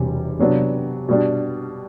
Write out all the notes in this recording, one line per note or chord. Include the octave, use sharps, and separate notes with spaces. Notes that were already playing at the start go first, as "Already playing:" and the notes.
Already playing: E1 E2 C3 E3 G3
C3 F#3 B3 D4
B2 G3 D4